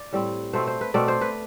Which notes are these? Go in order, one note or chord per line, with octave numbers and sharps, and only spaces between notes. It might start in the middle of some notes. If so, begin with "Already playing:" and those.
Already playing: D5
A2 G3 C4
B2 A3 C4 C5
C5
B4
B2 A3 C4 D5
C5
B4